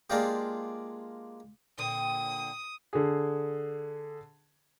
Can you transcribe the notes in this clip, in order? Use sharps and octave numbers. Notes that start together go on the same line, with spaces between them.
G#3 A#3 D4 F4 G4
A#2 D3 C4 D#6
D3 G#4